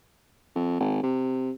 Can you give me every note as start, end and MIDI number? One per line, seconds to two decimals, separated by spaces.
0.55 0.77 41
0.80 1.01 32
1.03 1.51 48